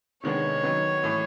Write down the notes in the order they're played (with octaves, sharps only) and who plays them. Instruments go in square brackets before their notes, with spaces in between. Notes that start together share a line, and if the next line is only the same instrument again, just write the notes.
[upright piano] C3 D#3 G#3 B3 D4 [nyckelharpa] C#5
[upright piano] D#3 F#3 B3
A2 E3 A3